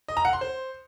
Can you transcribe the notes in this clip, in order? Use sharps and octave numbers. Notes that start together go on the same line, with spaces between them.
D#5
A#5
F#5
C6
C5